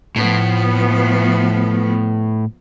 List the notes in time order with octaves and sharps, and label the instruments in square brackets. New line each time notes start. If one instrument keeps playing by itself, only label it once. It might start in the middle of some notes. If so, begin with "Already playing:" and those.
[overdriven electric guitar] A2 [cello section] F3 B3